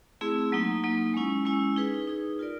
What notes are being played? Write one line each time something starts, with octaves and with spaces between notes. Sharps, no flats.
A3 C4 E4 G#4
F#3 A#3 D#4
F#3 A#3 D#4
G#3 C#4 E4
G#3 C#4 E4
D#4 G#4 B4
D#4 G#4 B4
F4 A#4 D5